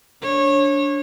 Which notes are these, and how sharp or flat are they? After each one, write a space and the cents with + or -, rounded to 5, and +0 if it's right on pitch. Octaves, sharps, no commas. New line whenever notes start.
D4 -20 C#5 -25